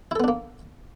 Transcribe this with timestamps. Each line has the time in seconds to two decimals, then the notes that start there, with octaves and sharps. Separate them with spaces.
0.11 E4
0.16 A4
0.20 B3
0.24 D4
0.28 A#3